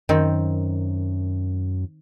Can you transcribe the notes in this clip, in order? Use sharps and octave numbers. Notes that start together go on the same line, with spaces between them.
F#2 D#3 C4